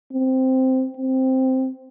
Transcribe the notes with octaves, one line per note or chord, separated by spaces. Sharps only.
C4
C4